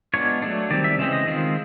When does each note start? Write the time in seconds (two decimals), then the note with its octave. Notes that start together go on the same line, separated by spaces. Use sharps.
0.14 G#3 B3 D4 F4 C#5
0.42 F#3 A3 D4
0.70 D#3 G3 C4 D5
0.84 E5
0.98 C#3 E3 G#3 C4 E5
1.13 D#5
1.27 D#3 G#3 C4 F4